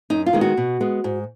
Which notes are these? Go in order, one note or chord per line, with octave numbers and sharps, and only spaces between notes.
F#2 D#4
F4
D#3 G#3 B3
F#4
B2
G#3 B3
G#2